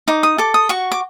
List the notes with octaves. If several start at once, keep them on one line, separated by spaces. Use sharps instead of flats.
D#4 D6
D#6
A4 D6
D#6
F#4 C#6
D6